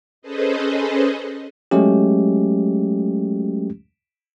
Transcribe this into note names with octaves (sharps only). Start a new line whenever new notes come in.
C#4 G#4 A4 B4 C5 D#5
F#3 G#3 A3 C#4 G4